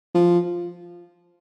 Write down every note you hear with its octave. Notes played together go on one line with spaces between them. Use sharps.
F3